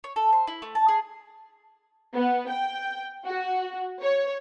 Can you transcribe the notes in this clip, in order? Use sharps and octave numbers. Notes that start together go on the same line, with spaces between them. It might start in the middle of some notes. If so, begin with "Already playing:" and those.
C#5
A4
C5
E4
A3
A5
G#4
B3
G5
F#4
C#5